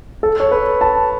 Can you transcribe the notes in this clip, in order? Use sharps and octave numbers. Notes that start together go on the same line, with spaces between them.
A4
C#5
B4
A5